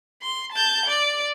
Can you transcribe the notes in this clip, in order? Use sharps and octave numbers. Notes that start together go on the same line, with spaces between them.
C6
A5 G6
D5